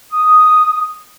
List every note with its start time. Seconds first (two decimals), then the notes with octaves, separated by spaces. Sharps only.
0.11 D#6